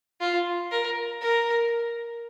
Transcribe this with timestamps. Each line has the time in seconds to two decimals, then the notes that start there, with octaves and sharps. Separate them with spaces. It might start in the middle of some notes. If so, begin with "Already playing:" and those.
0.20 F4
0.71 A#4
1.21 A#4